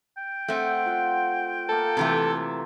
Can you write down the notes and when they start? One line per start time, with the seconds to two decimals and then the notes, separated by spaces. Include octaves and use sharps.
0.17 G5
0.48 A3 C4 F#5
0.86 F4 F#5
1.69 A#3 F4 A4 A5
1.97 C3 E3 A3